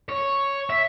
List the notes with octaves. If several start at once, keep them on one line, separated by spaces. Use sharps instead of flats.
C#5
E5